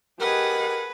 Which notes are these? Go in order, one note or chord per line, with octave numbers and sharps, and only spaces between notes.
G4 G#4 A#4 B4 D#5 F#5